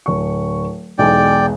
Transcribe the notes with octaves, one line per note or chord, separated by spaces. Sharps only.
D1 C#6
B1 E2 G#3 D5 G5